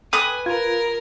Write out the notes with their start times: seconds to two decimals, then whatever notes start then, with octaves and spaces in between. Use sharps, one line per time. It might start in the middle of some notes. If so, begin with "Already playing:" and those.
0.13 B4 G#5 D#6
0.46 F4 A#4 G#6